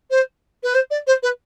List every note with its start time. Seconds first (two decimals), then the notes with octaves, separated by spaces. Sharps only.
0.10 C5
0.63 B4
0.74 C5
0.90 D5
1.07 C5
1.22 B4